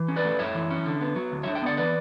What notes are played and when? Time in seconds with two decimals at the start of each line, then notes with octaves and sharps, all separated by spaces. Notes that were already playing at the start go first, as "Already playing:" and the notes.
Already playing: E3
0.08 C#4
0.16 B4 D5
0.25 A3
0.39 F#2 C#5 E5
0.55 E3
0.71 C#4
0.86 D3
1.01 B3
1.16 F#3
1.32 D2
1.43 C#5 E5
1.47 D3
1.55 E5 G5
1.62 B3 D5 F#5
1.77 E3 B4 D5